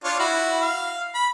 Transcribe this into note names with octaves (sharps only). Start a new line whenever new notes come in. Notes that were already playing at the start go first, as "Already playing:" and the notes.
D4 F4 C#5
E4 F#4
F5
B5